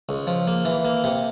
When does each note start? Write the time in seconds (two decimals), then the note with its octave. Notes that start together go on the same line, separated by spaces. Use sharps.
0.09 C#2
0.27 F3
0.47 A#3
0.65 E3
0.85 A#3
1.04 C3